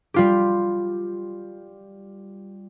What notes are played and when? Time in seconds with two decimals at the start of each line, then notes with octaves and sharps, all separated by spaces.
0.14 G3 F4 G4